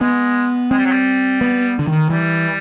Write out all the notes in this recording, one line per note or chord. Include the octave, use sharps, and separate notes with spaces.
G#3 B3
G#3 C4
G3
F#3
G3
B3
D3
D#3
E3 G3